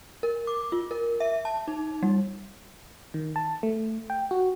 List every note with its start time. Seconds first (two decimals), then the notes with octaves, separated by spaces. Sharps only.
0.23 A#4
0.47 D6
0.72 F4
0.91 A#4
1.20 E5
1.45 A5
1.68 D#4
2.03 G3
3.14 D#3
3.36 A5
3.63 A3
4.10 G5
4.31 F#4